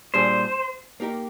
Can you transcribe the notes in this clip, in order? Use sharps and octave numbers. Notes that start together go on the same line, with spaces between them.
A#2 G3 D4 G#4 C5
A#3 D#4 G4 A#4